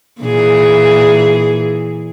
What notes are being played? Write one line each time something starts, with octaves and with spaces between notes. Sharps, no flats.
A#2 E3 G#4